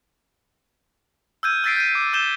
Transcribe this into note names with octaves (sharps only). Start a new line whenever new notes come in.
E6 F6 G6 G#6 D#7
E6 G#6 A6 B6 C7 D7
G6 B6 D#7
D6
E6 G6 A6 E7 G7